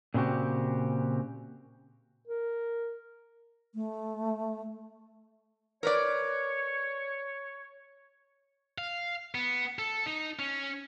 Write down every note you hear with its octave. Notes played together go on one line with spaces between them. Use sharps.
A#2 C#3 C4 F#4 G4
A#4
A3
A#4 B4 C#5 D5
F5
B3
A4
D#4
C#4